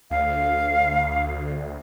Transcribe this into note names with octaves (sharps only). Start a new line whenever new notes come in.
D2 F5